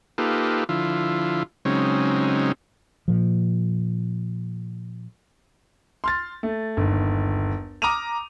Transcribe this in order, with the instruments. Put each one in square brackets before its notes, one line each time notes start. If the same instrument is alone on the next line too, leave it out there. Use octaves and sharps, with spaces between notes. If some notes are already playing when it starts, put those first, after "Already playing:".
[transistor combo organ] A#3 D#4 F4 G4 A4 B4
D3 F3 E4 F4
C#3 F#3 G#3 C4 C#4 D#4
[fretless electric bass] A#2 F3
[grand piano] C6 F6 A6
A3
G1 D#2
A#5 D6 D#6 F6 D#7 F7